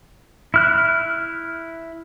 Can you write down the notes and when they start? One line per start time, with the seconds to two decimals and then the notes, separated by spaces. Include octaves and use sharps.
0.54 E4 F6 F#6